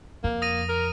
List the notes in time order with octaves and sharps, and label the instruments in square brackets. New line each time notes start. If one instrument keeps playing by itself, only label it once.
[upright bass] F2 [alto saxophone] A#3
[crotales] D#6 A#6 D#7
[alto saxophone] A#4